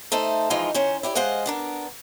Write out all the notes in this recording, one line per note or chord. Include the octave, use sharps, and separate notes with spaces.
A3 D#4 A4 C5
E3 F3 G#3 D#4 F4
D#3 C#4 C5
E4 G4 D5
G#3 C5 D#5 F5 F#5
B3 D4 A#4